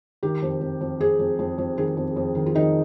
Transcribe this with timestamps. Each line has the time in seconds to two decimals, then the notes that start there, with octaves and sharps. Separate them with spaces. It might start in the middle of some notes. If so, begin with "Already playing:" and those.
0.23 D#3 G4
0.42 F2
0.61 F2
0.81 F2
1.00 F2 G#4
1.19 F2
1.39 F2
1.58 F2
1.77 D#3 G#4
1.97 F2
2.17 F2
2.35 D#3
2.46 F4
2.55 D#3 D#4